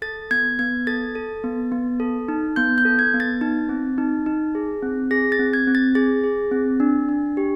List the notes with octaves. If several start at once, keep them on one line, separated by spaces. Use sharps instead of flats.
A4 A6
B3 G#6
B3 G#6
A4 A6
A4
B3
B3
A4
D#4
B3 G6
G6
A4
G#6
B3
A6
D#4
C4
D#4
D#4
G#4
C4
G#4 A#6
A6
C4
G#6
C4
A6
G#4 A6
G#4
C4
D4
D4
G4